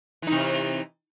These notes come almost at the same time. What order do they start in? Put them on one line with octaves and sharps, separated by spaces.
E3 D#4 C3